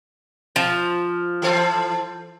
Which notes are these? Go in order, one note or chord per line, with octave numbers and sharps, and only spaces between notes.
F3
E3 A4 C5